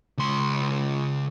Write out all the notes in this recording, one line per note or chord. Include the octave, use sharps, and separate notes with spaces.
C#2 C6